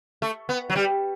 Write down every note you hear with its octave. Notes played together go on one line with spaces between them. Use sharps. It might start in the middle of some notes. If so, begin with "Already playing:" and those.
A3
B3
F#3
G3